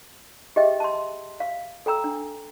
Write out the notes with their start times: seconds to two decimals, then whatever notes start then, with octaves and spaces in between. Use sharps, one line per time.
0.56 G4 G#4 D#5 E5 G5
0.80 A5 C6
1.40 F5
1.86 A4 G5 A#5 E6
2.04 D4